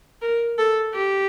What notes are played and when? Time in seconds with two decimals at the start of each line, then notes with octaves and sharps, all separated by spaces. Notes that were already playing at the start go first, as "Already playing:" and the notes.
0.22 A#4
0.58 A4
0.95 G4